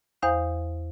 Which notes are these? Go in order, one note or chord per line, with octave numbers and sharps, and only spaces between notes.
E2 C5 F5 F#5 D#6 G6